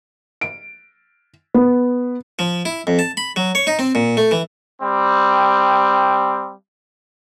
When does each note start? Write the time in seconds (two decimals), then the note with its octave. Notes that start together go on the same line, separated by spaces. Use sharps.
0.41 D7
1.54 B3
2.39 F3
2.65 E4
2.87 F2
2.99 A5
3.17 B5
3.36 F#3
3.55 C#5
3.67 D#4
3.79 C4
3.95 A#2
4.17 A3
4.31 E3
4.82 G3 C4